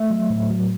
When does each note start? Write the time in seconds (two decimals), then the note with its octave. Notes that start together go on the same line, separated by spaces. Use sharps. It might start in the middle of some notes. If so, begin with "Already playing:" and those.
Already playing: A3 E5
0.10 F#3
0.30 A2
0.50 F#3